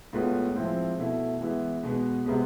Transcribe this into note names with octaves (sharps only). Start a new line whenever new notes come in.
A2 G#3 B3 F4
F3 G#3 C4 E4
B2 A3 E4
E3 G#3 B3 E4
B2 G#3 B3
C3 G#3 B3